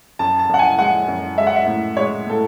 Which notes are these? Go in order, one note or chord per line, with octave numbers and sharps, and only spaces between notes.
F#2 A5
A5
F#2 F#5
G#5
G#3 F#5
F#2
G#3 E5
F#5
E5
A2
G#3 C#5
A2 A4